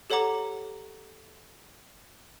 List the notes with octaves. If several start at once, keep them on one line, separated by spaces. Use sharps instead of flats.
G4 A4 C#5 F#5 A#5 D6